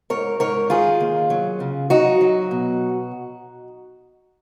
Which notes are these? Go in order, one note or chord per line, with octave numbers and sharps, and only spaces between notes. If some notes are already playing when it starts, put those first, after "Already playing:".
G#2 A#4 C#5
G#2 A#4 C#5
D#3 F4 G#4
D#2
F#3
C#3
F#3 D#4 F#4
F#3
B2